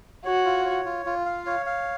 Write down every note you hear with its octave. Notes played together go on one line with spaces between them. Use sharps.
F#4 C#5
F4
C#5
F4
F4
F5
C#5
F5